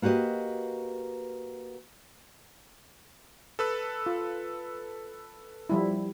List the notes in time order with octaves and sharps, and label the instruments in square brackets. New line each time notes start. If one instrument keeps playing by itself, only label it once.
[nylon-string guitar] A#3 F#4 G4 B4 D#5
[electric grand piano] A4 B4 E6
[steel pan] F4
F3 G3 E4